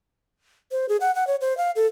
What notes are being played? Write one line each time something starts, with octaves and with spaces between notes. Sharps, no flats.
C5
G#4
F#5
F#5
C#5
C5
F5
A4